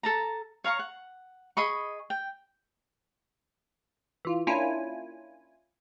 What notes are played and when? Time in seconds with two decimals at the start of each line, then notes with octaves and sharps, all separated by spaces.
0.03 A4 A5 A#5
0.64 C#5 F5 A#5 C#6
0.79 F#5
1.57 G#4 D#5 B5 C#6
2.10 G5
4.25 E3 F4
4.47 A#3 C#4 D4 E4 F4 G#5